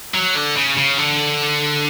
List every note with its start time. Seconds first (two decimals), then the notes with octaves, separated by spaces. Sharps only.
0.14 F#3
0.36 D3
0.56 C#3
0.77 C#3
0.98 D3